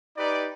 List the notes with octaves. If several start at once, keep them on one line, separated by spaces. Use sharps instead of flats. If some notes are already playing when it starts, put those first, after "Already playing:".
D#4 G4 B4 D5